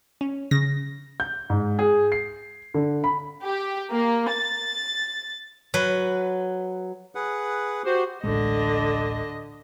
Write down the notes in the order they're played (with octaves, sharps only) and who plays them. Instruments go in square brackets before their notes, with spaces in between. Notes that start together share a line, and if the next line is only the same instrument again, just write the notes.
[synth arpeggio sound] C#4
C#3 A#6
[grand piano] G6
G#2
G#4
C7
D3
B5
[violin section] G4
A#3
A6
[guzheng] F#3 B4
[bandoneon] G#4 B4 F#5
[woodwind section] F#4 G4 C5
[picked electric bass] D1 A1 G#3 [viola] D3 D#5